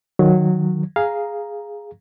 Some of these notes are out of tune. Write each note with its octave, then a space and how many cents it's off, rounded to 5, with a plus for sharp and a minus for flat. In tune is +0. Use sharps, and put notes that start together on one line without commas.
D#3 -15 F#3 -15
G#4 +0 F5 +0 A#5 +0